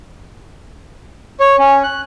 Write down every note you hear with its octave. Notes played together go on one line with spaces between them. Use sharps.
C#5
C#4
F#6